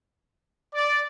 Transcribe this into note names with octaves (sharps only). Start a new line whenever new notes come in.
D5